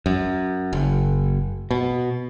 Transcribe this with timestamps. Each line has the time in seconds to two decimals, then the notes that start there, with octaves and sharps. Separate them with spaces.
0.06 F#2
0.73 F#1
1.71 B2